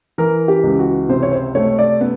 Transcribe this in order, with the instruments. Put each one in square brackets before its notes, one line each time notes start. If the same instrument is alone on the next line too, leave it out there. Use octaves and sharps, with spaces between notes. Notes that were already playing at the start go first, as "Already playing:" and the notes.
[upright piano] E3 A#4
G4
C#2
F#4
C3 C5
C#5
C5
A3 C#5
D5
B3